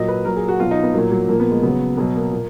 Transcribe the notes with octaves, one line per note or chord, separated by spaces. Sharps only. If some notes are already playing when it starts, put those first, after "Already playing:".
Already playing: A#2 F#3 D#5
B4
A#2 F#3 A#4
G#4
F#4
B2 F#3 F4
D#4
B3
A#2 F#3 A#3
F#3
A#2 F3 A#3
B3
G#3
C#3 F#3 B3
B2 F#3 B3
A#3
A#2